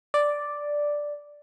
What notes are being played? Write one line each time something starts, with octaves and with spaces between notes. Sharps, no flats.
D5